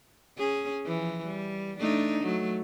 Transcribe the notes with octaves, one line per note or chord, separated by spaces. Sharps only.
C#4 G#4
E3 F3
G3
A3 D4 D#4
F#3 A3